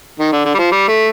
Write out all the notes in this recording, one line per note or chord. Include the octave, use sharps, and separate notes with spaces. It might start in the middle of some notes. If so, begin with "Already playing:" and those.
D#3
D3
D3
G3
F3
G3
A3